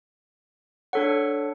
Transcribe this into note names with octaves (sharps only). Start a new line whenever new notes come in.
D4 A4 C#5 F#5